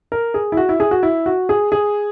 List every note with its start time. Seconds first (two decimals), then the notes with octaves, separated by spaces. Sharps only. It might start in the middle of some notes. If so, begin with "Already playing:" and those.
0.12 A#4
0.34 G#4
0.52 E4
0.57 F#4
0.69 E4
0.80 G#4
0.91 F#4
1.03 E4
1.26 F#4
1.49 G#4
1.72 G#4